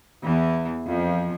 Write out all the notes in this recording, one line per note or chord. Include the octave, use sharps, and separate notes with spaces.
E2 E3
F2 F3